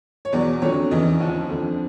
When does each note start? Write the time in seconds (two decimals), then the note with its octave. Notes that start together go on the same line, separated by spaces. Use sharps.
0.25 C#5
0.33 E2 B2 F#3 D5
0.62 F2 D3 F#3 C#5
0.91 E2 C#3 E3 D#5
1.20 D#2 C#3 F3
1.49 F2 D3 F3